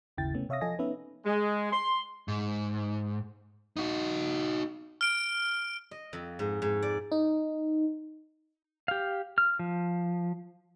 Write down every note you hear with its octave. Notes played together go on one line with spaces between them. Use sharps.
G1 D#2 C#3 E4 G5 A6
C3 A3 B3 C#4
C3 C#5 E5 F5 D#6 A#6
F3 A4 D#5 G#5 A#6
B3 C#4 D#4 B4 E5
G#3
C6
G#2
D#4 F#4
F6 D7
D#5
F2
G#2
G#2
D5
D#4
G4 F5
F6
F3